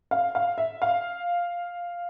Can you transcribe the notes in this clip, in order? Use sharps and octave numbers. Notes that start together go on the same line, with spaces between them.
F5
F5
E5
F5